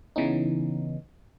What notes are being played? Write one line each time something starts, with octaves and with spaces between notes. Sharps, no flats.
C#3 E3 B3 C#4 D#4